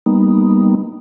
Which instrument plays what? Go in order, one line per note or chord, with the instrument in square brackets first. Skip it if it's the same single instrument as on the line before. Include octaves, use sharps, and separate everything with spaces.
[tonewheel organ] G3 A#3 B3 D#4